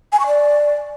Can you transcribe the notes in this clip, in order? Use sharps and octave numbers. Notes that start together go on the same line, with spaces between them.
G#5
C#6
D5